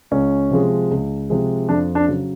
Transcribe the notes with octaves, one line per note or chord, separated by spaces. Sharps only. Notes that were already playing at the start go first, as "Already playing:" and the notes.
C#2 C#4
C3 F3 G#3
C#2
C3 F3 G#3
F2 D4
D4
C#3 F#3